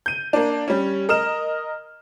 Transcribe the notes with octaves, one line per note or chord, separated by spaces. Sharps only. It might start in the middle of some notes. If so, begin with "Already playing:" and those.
G6 D#7
A#3 D4
G3 C#4
A#4 D#5 F6 E7